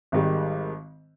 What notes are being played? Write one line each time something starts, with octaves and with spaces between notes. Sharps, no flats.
G#1 G#2 D#3 G3